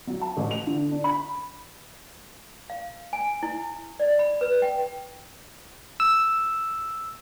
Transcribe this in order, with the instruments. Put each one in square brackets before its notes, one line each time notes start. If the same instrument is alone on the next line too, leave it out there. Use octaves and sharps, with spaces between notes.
[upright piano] F#3
A5
A1
F7
D3
D4
B5
[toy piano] F5
G#5
E4
D5
B5
B4
G5
[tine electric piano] E6